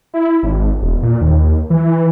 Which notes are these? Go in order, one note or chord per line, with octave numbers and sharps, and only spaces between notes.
E4
G#1
E1
A#2
D#2
E3